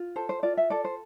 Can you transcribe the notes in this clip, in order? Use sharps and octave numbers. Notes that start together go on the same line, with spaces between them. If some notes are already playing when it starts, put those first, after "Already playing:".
Already playing: F4
A4 C5
C5
F4 D5
E5
A4 D5
C5